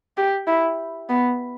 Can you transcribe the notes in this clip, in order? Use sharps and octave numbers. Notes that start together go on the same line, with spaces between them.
G4
E4
B3